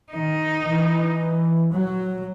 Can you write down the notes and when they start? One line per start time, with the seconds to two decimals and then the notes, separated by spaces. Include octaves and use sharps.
0.13 D#3 D#4
0.67 E3
1.73 F#3